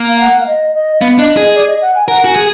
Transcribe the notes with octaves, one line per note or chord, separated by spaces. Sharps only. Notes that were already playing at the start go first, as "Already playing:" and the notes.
Already playing: A#3
F5
F#5
F5
D#5
D#5
B3 F5
D4 D#5
G#4 D#5
D5
D#5
F#5
G#5
A#4 F#5
F#4 G#5
G#4